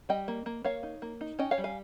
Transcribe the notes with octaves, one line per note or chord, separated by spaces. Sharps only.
G3 D#5 G5
A#3
A#3
A#3 C#5 F5
D#4
A#3
D#4
C#4 D#5 G5
C#5 F5
G3
F5 G#5